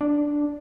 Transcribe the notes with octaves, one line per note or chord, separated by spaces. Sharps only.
D4